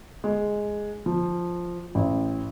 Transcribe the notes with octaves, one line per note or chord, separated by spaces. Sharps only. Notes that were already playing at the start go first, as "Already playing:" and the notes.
G#3
F3
A1